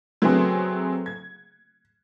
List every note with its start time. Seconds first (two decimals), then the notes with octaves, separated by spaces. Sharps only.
0.22 F#3 A3 B3 C4 G#4
1.06 G#6